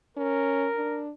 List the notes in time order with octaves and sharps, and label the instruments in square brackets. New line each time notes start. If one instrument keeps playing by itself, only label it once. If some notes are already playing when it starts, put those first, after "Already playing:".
[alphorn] C#4 [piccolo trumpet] A#4
[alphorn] D4